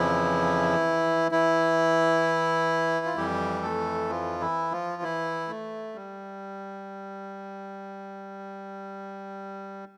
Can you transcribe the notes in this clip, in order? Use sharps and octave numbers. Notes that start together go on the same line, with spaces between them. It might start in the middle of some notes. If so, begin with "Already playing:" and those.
Already playing: F2 C#3 E3 F3 E4
E3 E4
F4
F2 E3 G3 G4
A3 A4
F3 F4
E3 E4
F3 F4
E3 E4
A3
G3